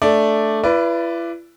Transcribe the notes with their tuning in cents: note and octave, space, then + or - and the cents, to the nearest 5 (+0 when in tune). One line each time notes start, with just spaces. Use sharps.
A3 +0 D4 +0 D5 +0
E4 +40 B4 +0 D5 -5